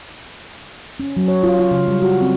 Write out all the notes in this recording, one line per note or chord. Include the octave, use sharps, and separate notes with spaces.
C#4
F#3
C#5
F4
F4
C#3
G3
F#4
C4